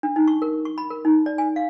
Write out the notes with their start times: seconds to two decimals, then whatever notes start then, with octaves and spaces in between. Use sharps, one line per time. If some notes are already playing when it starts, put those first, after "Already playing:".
0.03 D4
0.16 D#4
0.28 C#6
0.42 A#4
0.65 C#6
0.78 B5
0.90 A#4
1.05 D#4
1.26 D5
1.38 G#5
1.56 F5